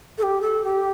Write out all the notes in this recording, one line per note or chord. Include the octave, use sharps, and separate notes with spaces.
A4
G4
A4
G4